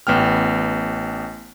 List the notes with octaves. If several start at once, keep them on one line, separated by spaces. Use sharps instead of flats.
A1 B3 G5 F6